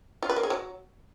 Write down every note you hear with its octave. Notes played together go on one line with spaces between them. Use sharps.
F4
B4
A#3
G#4
F#3